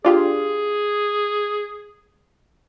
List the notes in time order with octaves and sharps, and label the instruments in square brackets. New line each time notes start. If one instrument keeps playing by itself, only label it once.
[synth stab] D4 F4 G4 [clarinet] G#4